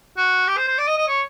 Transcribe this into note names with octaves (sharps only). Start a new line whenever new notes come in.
F#4
G4
C5
C5
D5
D#5
D#5
C#5